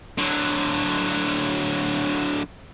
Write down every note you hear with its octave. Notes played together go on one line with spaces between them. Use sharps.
D3 F#3